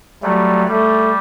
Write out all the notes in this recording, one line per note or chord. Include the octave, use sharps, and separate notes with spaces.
F#3 G3 A3
G3 A3